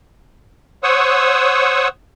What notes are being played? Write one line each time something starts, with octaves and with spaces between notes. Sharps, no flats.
C5 C#5 F#5 C#6 D#6 E6